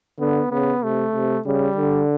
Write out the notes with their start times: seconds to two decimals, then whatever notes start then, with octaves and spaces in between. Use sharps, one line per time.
0.20 D3 B3
0.51 C#3 B3
0.83 C3 A3
1.14 C3
1.46 C#3 G3
1.77 D3